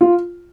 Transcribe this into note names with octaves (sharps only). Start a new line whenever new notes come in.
F4